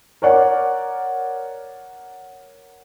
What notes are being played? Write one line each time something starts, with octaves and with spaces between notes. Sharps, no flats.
A#4 C#5 D5 F#5